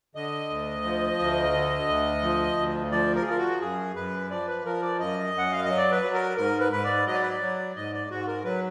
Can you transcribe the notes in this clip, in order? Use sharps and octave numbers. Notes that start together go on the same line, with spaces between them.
D3 D#5
D2
F3
D2
D3
D2
F3
D2
F3 D5
A#4
G#4
F3 A#4
F#4
F#2 G#4
F#2 B4
F3 D5
B4
F3 A#4
D5
F#2 D#5
F#2 F#5
F5
F#3 D#5
D5
B4
F#3
A#4
G#2 A#4
B4
G#2 B4
D5
F#3 D#5
D5
B4
D5
F#3
G#2 D#5
D5
G#2 F#4
A#4
F#3 B4